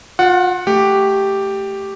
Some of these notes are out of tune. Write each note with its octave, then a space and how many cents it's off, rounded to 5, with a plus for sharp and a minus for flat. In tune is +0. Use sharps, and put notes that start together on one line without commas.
F4 +35 F#5 +0
A3 +0 G4 +0